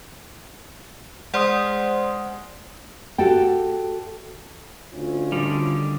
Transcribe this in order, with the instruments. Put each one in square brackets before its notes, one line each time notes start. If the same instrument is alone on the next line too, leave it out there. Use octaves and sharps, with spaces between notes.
[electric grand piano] G#3 C6 D#6 [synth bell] C5 D5 F#5
[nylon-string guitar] F#4 G4 A4 G5
[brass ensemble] D2 C#4 F4
[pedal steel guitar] D3 D#3 G3